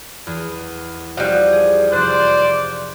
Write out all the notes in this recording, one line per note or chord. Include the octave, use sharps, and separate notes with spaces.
E2
F3 G3 F#4
G#4
F1 C5 D5 F#6